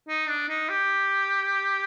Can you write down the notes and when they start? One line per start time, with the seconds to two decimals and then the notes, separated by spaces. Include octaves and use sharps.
0.08 D#4
0.28 D4
0.49 D#4
0.69 G4